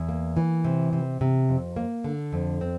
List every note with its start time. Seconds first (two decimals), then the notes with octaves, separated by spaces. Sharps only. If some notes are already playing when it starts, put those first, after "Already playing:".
Already playing: E2
0.09 A#3
0.37 E3
0.64 C3
0.93 C3
1.21 C3
1.49 F2
1.76 A#3
2.04 D3
2.33 F2
2.61 C4